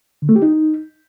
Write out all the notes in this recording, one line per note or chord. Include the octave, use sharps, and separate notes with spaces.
D3
A3
G4
D#4